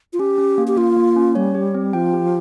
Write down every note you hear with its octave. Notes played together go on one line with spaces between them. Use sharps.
F4
C#4 G4
C#4
A#3
G4
A#3 F4
A#3
C#4
G3 C#5
G4
C4
F3 G5
G4